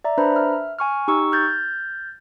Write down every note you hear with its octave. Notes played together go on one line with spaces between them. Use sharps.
D5 E5 A#5
D4 B4 C5 A#5 B5
E5 F6
G#5 C#6 F6
D#4 G4 C#6 E6
F6 G6 A6